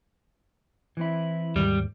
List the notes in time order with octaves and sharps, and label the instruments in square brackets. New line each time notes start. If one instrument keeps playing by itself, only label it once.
[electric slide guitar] E3 C4 E4
[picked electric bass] D#2 G#2 [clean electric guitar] G3